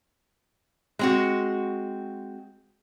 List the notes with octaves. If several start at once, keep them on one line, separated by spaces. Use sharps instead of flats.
G#3 C4 F#4